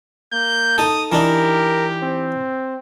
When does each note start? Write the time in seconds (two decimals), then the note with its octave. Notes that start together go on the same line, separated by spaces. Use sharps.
0.33 A#3 G6
0.78 D#4 A4 D#6
1.12 E3 D4 D#4 G4 A#4
2.03 C4